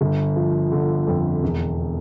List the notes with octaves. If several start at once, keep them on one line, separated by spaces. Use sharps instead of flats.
G1
F3
D3
F2
E1